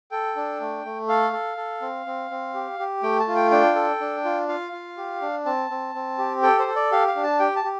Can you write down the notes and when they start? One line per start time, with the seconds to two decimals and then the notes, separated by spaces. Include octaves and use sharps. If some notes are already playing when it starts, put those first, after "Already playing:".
0.11 A4 G5
0.36 D4
0.60 A3
0.85 A3
1.08 A4 F5
1.33 A4
1.57 A4
1.81 C4
2.06 C4
2.30 C4
2.54 G4
2.79 G4
3.03 A3 G5
3.20 A5
3.27 F4
3.36 G5
3.51 D4 G5
3.75 A4
4.00 D4
4.24 F4
4.48 F4 F5
4.72 F4
4.97 G4
5.21 D4
5.45 C4 A5
5.70 C4
5.95 C4
6.18 G4
6.42 A4 G5
6.59 C5
6.67 A4
6.76 D5
6.92 G4 F5
7.08 F5
7.15 D4
7.23 A5
7.39 G4 G5
7.56 A5
7.64 G4